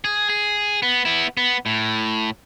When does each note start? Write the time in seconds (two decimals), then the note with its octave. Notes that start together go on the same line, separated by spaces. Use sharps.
0.04 G#4
0.29 G#4
0.83 B3
1.05 B3 E4
1.37 B3
1.66 A2